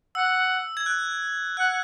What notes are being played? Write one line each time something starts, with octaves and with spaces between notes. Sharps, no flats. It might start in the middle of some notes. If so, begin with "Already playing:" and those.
F#5 E6
G#6
F#6
F#5 F#6